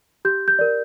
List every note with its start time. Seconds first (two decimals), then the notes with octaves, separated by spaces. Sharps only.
0.25 G4 G6
0.48 G6
0.59 A#4 D5